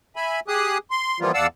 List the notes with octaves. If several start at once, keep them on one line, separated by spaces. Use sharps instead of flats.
E5 G#5 B5
G4 G#4 G#5 D#6 F#6
C6
E3 F3 G3 A#3 B3 F4
E2 D5 F5 F#5 A5 E6